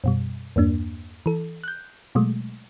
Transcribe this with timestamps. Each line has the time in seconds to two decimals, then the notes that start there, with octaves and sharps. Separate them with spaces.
0.04 F#2 B2 G3
0.56 E2 G2 A#3 D4
1.26 E3 A4
1.64 F#6 G6
2.15 B2 F#3 G#3 A3